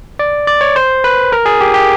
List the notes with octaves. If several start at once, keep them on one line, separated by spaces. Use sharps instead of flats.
D5
D5
C#5
C5
B4
A#4
G#4
G4
G4